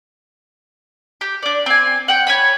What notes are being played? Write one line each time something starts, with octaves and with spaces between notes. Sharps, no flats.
G4
D4 D5
C4 G#5
F#5 G5
C#5 G#5 B5